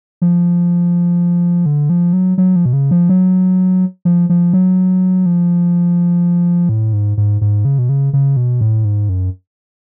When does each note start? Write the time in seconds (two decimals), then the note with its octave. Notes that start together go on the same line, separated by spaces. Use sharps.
0.22 F3
1.66 D3
1.90 F3
2.13 F#3
2.38 F#3
2.56 F3
2.66 B2
2.73 C#3
2.91 F3
3.09 F#3
4.05 F3
4.29 F3
4.53 F#3
5.26 F3
6.69 A2
6.93 G#2
7.17 G#2
7.41 G#2
7.65 C#3
7.79 B2
7.89 C#3
8.13 C#3
8.37 B2
8.61 A2
8.85 G#2
9.09 F#2